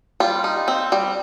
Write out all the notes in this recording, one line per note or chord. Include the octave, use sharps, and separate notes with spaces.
G3 F4
D#4
C4
G3